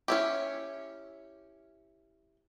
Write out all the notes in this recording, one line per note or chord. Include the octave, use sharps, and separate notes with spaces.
C#4 E4 G4